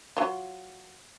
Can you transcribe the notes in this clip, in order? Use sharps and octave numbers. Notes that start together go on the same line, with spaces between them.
F#3 F4